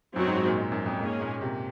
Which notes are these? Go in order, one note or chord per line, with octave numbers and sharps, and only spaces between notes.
F#2 F#3 C4 D#4 F#4
G#2
G#2
A#2
A#2
F#2
F2
G#2 A#3 C#4 G#4
A#2
C3